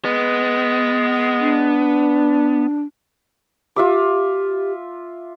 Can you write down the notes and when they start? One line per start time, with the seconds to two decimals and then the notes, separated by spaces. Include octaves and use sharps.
0.05 G#3 B3
1.40 D4
3.76 F4 G4 E5 D6